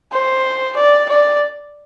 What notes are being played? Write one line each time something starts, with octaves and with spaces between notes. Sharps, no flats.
C5
D5
D5